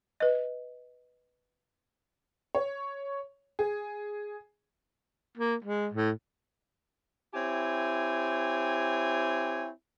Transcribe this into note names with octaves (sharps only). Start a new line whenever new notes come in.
B4 D#5
C#5
G#4
A#3
G#3
A2
C4 E4 G4 C#5 G#5